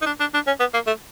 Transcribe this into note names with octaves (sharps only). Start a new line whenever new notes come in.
D#4
D4
D4
D4
C#4
B3
A#3
A3